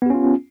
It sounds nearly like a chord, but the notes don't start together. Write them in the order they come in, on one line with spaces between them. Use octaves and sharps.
B3 G4 C#4 F4